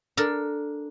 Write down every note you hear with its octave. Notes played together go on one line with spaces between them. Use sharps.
D4 A4 A#4